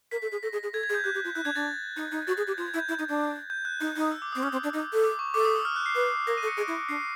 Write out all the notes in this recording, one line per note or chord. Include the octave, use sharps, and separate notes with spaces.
A#4 B6
A4
G#4
A4 A#6
G#4
G#4
A4 G#6
G#6
G#4
G6
G4 F#6
G4
F4
E4 F#6
D4 G#6
D4 A6
D#4
D#4
F#4 A6
G#4
G4
G6
F4 G#6
G#6
E4
G6
E4
D#4
D4
G6
F#6
D#4
D#4
E6
D6
C4 D#6
C#4 E6
C4
D4
D#4
A4
D6
C#6
A4 D6
D#6
E6
F6
F#6
C7
B4
A#4 A#6
D#7
A4
C#7
G#4 D7
E4 C#7
C#7
D4 C7